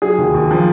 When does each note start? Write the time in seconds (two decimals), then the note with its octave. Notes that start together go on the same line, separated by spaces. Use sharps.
0.02 F#3 G#4
0.18 D#2
0.34 D#2
0.51 F3